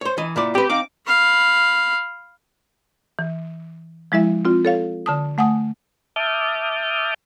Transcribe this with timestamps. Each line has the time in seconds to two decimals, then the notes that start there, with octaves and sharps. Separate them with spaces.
0.01 C5 C#5
0.18 E3 D#5
0.36 A#2 E4 D5
0.55 C4 G4 B4
0.70 C4 D#4 F5 D6
1.07 F5 B5
3.19 E3
4.12 F3 G#3 E4 E5
4.45 C4 F4
4.65 A4 C#5 F5
5.06 D3 A5 D#6
5.38 A3 F#5 G#5 D#6
6.16 E5 A5 D6 D#6 F6 G6